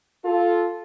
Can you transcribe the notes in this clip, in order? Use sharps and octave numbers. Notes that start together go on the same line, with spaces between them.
F4 A4